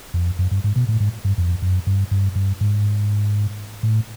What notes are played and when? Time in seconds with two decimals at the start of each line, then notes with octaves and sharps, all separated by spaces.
0.14 F2
0.39 F#2
0.51 G2
0.64 G#2
0.76 B2
0.89 A2
1.00 G#2
1.25 G2
1.38 F2
1.62 F#2
1.87 G2
2.11 G2
2.36 G2
2.61 G#2
3.83 A2